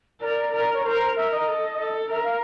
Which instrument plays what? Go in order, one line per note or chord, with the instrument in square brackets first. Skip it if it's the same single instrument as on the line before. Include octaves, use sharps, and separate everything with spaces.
[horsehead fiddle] A#4 [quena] D5
[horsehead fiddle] A#4
[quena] C#5
[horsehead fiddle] A#4 [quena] C5
[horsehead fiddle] A#4 [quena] E5
[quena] D#5
[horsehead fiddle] A4
A4
[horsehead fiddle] A#4 [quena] E5
[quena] F5